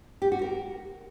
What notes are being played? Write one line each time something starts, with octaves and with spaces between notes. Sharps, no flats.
G4
F#4
A#4